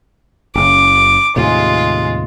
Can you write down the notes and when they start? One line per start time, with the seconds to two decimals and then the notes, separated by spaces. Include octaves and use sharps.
0.55 F#1 C#3 D6
1.36 D#2 A2 C3 G#3 F4